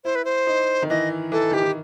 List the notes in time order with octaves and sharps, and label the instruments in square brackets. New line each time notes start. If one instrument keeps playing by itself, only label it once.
[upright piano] E4 [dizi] C5
[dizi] B4
C5
[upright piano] D#4
D#3
[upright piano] E3 [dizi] D#5
[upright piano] E3 [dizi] A4
[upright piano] D#3 [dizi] G4
[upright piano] E3